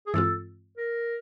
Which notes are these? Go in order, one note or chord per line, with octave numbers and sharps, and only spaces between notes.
G#4
G2 E3 G#3 C4 F4 A4
A#4